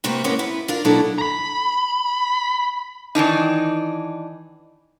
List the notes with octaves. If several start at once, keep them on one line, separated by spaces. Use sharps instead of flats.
C3 A3 A#3 F#4 G4 B4
F#3 G#3 A#3 B3 C#4 E4
B3 E4 B4
D4 F4 A#4
B2 F#3 A#3 D4 E4 A4
A#5 B5
D#3 E3 D4 D#4